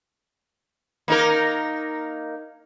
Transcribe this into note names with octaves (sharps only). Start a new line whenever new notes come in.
A#3 D#4 A#4